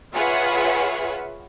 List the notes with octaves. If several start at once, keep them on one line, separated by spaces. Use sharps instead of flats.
F4 G#4 B4 C#5 E5 F#5